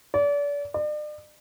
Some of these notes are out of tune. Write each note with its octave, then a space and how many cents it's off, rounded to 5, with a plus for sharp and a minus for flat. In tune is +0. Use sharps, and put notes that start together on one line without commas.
D5 -35
D5 +40